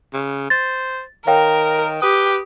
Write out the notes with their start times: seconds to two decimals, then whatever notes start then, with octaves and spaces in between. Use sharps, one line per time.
0.13 C#3
0.50 C5 A6
1.27 D#3 A#4 C#5 F5 G5
2.02 G4 B4 D#6